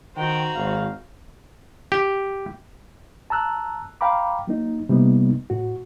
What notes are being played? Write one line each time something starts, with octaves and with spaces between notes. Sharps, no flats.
D#3 F#4 C5 G5 A#5
G#1 F5
G4
A5 A#5 E6 F#6
F5 G5 A#5 B5 D6
F#3 A#3 D#4
C3 G3 A#3 B3 D#4
A2 F#4